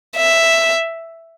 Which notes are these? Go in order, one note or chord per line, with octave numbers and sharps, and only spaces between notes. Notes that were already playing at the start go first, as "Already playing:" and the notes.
E5